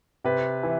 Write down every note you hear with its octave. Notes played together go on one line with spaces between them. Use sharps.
C3 B4
E3